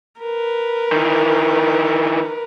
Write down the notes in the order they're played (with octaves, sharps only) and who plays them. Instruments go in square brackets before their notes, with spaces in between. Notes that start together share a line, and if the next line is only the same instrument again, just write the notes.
[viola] A#4 B4
[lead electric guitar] D#3 E3